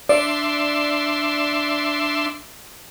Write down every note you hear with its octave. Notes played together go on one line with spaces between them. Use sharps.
D4 D5 E5 C6